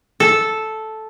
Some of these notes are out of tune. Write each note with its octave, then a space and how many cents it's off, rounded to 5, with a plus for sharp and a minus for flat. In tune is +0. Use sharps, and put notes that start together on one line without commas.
A4 -5